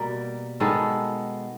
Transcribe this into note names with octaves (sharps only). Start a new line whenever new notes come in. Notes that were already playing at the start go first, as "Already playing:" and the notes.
Already playing: B2 G3 A#3
D#3 G#3 B3 A4